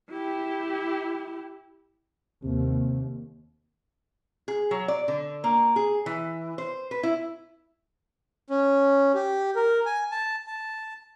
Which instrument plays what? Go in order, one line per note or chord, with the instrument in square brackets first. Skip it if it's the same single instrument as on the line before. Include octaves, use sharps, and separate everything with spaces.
[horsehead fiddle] E4 G4
[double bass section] D#2 [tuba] C3
[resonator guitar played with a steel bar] G#4
F#3
D5
D3
A#3
G#4
E3
C5
B4
E4
[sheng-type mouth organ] C#4
G4
A#4
G#5
A5
A5